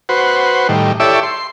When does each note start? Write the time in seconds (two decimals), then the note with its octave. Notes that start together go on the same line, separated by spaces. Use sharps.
0.09 F#4 B4 C5
0.69 A2 D#3 G3
1.00 E4 G4 A4 C#5 D5 E5
1.23 C6